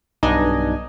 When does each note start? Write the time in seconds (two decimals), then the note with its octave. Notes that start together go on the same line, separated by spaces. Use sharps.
0.23 B1 G2 D4 D#4 D#5 G#5